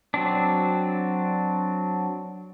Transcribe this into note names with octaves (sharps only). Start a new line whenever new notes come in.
F#3 C4 D4